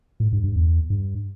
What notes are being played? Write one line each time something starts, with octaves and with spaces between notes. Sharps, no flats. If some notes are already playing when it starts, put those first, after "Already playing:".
A2
G2
G2
E2
G2